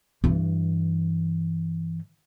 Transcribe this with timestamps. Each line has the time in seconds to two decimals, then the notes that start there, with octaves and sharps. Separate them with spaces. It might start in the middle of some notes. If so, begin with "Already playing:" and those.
0.24 G2 E3